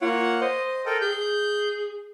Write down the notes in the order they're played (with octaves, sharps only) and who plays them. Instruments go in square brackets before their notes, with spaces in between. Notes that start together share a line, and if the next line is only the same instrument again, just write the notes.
[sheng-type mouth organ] A#3 C#5 F#5 [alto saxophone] F4
[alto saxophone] C5 [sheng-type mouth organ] D#5
[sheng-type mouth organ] A4 A#4 G5
[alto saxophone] G#4 [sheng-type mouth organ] G6